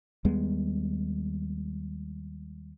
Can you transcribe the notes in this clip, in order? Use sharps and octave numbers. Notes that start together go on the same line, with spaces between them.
D#2 G3 G#3 B3